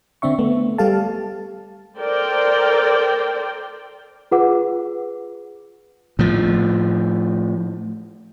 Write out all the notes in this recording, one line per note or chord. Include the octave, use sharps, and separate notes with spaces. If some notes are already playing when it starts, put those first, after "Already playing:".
D3 C4 D4 E5 C#6
A3 B3
G3 G4 A4 F5 A5
A4 A#4 C5 D5 G5
F4 G#4 B4 F#5 D6
A2 F3